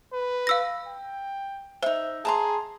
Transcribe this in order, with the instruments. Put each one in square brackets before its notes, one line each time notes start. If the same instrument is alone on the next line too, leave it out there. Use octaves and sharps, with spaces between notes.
[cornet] B4
[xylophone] F5 E6 A#6
[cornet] G5
[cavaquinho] D#4 E5 [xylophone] C5
[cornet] G#4 [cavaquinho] A5 A#5 C6